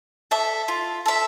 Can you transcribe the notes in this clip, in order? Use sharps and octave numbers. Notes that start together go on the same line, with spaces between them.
A4 E5
F4
A4 E5